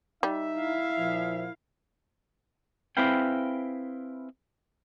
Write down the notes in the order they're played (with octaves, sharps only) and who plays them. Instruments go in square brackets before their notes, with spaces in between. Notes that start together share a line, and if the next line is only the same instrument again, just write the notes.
[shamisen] G3 [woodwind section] D#4 [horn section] E5
[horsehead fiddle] E4 F5
[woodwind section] A#2 F3
[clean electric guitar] C4 E4 G#4 B4 F5 G5